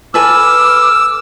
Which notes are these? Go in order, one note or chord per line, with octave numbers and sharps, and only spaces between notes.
A4 B4 G#5 D6 E6 F6